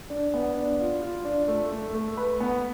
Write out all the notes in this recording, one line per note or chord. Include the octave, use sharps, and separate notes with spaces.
D4
B3
D4
F4
F4
D4
A3
A3
A3
B4
B3